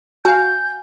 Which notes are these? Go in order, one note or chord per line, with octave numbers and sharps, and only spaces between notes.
F#4 F5 G#5 G6